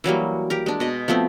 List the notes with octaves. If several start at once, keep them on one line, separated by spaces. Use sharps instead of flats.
E3 F#3 G3 A#3
G4 A#4
G#3 D4
B2 D#5
F3 A3 B3 C4